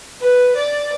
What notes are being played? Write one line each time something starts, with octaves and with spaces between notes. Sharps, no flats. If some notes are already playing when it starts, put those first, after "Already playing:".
B4
D5